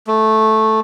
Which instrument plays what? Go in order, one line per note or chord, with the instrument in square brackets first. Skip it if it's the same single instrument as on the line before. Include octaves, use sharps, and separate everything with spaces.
[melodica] A3